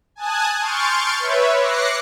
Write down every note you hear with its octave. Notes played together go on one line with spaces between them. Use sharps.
G#5 A5 D#6 F#6 G#6
C6 C#6 F6 G6 A6 D7
B4 C#5 E5
D6 F#6 A#6 C7 C#7